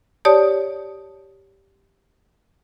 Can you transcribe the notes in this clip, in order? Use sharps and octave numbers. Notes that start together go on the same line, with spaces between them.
G4 C#5 D5 A5 D#6